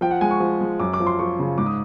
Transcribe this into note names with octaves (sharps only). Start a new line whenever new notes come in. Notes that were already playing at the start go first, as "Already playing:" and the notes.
F3 G5
F#5
G#3 G#5
C#6
F3
G#3
F#2 D6
D6
F3
C6
F3 C#6
C#3
G#2 D6
D#6